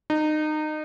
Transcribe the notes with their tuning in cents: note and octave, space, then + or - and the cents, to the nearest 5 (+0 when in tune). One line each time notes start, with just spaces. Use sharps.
D#4 -25